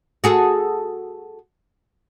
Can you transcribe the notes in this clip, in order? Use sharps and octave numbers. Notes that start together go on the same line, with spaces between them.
F#4 G#4 A4